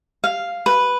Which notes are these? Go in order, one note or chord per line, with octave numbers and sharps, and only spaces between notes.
F5
B4